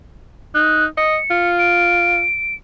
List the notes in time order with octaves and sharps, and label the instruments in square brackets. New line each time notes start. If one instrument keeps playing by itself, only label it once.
[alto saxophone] D#4 [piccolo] F#6
[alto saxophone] D#5 [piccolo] C#7
[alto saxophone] F4
[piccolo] D7